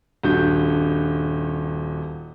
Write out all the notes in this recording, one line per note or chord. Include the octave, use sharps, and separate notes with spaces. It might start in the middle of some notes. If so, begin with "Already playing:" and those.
D#1 G2 F#4 G6